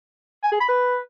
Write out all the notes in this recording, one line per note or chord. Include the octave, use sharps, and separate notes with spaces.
G#5
G#4
B5
B4